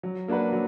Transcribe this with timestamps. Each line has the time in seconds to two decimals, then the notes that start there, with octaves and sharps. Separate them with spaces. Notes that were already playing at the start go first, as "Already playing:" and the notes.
0.03 F#3
0.28 A#3 D4 F#4 B4
0.52 F#3